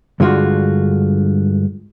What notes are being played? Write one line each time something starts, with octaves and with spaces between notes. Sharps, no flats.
G2 D3 G#3 F4 F#4